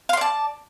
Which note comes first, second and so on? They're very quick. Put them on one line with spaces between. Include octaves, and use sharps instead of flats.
F5 C6 D5 A5